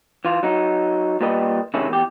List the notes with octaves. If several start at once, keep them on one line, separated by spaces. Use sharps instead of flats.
E3 F4
F#3 D#4
A#2 G3 B4 D#5
C3 D#3 G#3 C#4 E4
E2 G4